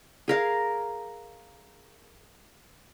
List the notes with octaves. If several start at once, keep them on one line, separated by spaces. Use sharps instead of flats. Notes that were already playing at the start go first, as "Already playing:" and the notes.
G#4 A#4 F5